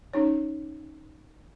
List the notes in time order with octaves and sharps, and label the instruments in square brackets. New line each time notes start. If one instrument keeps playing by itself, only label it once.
[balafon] C#4 D#4 C#5